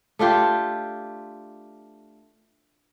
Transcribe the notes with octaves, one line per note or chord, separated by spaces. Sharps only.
A3 D4 F4 G4